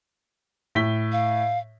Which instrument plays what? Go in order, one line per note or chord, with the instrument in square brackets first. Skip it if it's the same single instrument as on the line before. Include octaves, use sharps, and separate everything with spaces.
[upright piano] A2 B6 G7
[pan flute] F5